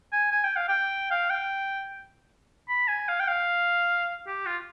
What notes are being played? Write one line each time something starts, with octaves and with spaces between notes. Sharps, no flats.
G#5
G#5
G5
F5
G5
F5
G5
B5
G#5
F5
G5
F5
G4
F4